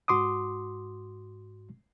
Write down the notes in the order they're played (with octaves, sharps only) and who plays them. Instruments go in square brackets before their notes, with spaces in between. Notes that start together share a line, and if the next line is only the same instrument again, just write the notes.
[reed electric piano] G#2 F#4 C6 D6 D#6